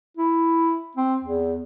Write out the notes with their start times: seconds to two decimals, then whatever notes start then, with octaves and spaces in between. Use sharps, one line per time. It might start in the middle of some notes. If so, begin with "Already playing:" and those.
0.17 E4
0.97 C4
1.25 E2